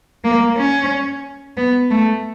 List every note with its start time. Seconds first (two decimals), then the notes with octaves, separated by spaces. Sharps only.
0.24 A#3
0.57 C#4
1.57 B3
1.91 A3